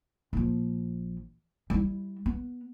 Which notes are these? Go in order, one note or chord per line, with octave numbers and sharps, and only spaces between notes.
A#1 F3
G3 E4
B3